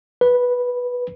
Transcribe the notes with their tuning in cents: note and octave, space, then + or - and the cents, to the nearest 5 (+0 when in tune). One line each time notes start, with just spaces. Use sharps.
B4 -5